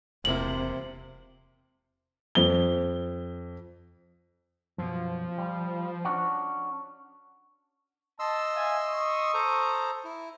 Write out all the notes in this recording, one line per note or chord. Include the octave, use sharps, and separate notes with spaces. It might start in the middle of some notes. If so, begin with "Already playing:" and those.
E1 C3 F3 A#3 E4 F#7
F2 G7
F#2 B2 F3
G3
C#4 D4 F#4
D#5 A5 C6 E6
E5 F5 G#5
C#6 D#6
A4 C5 A#5
E4